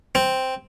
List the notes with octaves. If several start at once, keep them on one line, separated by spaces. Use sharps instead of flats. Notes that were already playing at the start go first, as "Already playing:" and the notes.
C4